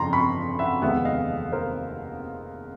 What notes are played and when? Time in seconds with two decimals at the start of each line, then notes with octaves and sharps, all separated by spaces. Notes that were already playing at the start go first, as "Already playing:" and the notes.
Already playing: G1 F2 C#3 A5 A#5 C6
0.13 B5 C#6
0.59 E5 F#5
0.82 F1 D#2 D#3 G#3 B3 E5 F#5
1.05 D#5 F5
1.52 A#4 C5